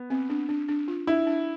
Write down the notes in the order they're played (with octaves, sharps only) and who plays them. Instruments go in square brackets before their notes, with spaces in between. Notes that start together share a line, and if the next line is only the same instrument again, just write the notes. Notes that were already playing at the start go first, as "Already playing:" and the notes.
Already playing: [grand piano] B3
[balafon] C4
D4
D4
D4
F4
[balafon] D4 [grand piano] E4
[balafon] D4